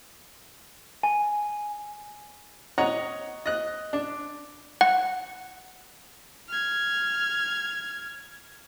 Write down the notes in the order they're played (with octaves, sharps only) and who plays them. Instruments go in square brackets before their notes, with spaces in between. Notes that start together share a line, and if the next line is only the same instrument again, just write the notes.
[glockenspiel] G#5
[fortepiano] C#5 D#5 F#5 A#5
D#5 F#6
D4
[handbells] F#5
[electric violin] F6 G#6